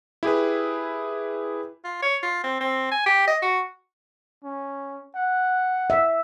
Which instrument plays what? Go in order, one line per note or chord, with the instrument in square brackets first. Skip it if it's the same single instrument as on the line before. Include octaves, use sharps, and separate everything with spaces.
[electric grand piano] E4 G4 G#4 B4
[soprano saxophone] F4
C#5
F4
C4
C4
G#5
G4
D#5
F#4
[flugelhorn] C#4
F#5
[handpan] E5